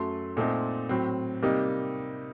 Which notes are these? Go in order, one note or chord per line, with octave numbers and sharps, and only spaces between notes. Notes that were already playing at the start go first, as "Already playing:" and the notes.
Already playing: F#2 F#3 A3 C6
A#2 A3 C4 D#4
A2 F#3 C4
C3 G3 A#3 D#4